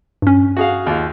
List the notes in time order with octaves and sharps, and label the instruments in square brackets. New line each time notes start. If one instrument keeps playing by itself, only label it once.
[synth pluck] G2 C#4
[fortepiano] F#4 G#4 F5
D#2 F4